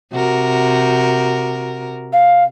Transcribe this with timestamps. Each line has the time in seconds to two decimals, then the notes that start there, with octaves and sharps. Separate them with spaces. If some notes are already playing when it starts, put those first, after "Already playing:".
0.12 C3 F#4 A#4
2.13 F5